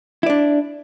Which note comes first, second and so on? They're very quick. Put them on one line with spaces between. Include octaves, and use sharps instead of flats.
E4 D5 D4